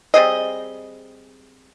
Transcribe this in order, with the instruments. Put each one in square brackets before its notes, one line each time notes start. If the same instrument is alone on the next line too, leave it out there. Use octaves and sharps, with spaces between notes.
[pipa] G3 C4 G#4 D#5